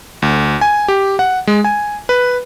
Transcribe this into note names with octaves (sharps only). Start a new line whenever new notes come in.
D2
G#5
G4
F#5
G#3
G#5
B4